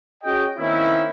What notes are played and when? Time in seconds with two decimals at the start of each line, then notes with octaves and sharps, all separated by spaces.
0.24 C#4 F#4 G#4 D#5 G5
0.58 D#3 A#3 C4 C#4 D#4 E4